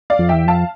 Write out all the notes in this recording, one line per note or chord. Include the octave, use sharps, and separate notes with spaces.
D5 F5
F2
E2 E5 G5
F2 F5 A5